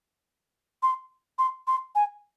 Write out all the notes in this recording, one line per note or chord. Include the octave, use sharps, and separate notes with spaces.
C6
C6
C6
G#5